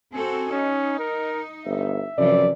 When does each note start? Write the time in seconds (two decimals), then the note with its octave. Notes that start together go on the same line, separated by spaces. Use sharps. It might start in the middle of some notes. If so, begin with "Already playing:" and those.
0.13 C4 F#4 A4 G#5
0.51 C#4 D#4
0.99 A#4
1.66 G1 E5
2.18 F#2 C3 E3 F3 D5